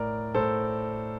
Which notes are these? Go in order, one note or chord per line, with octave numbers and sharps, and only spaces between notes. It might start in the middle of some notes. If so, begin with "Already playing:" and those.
Already playing: A2 A#4 D5
A2 A4 C5